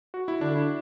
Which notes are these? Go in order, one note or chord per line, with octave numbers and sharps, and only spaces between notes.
F#4
E4
D3 D4
E4